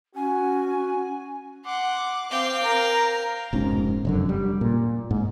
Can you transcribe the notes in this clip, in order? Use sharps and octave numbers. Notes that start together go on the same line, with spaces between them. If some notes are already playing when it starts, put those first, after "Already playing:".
C#4 F#4 G#5
F#5 C6 D6
C4 F5 G5
A#4 A#5
F1 G#2 B2 C#4
F1 F#2 D3
G3
A#2
G#2